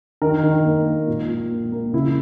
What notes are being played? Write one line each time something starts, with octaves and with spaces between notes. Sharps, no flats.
D#3 A#4
D#3
A#3
A#3
A#2
A#2
A#3
A#3
C#3 E4